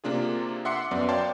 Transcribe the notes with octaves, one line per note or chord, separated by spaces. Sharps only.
C3 A#3 D4 F4 G#4
E5 F#5 C6 D6 C7 C#7
F#2 B3 D5
C#5 D5 F5 G5 A5 C6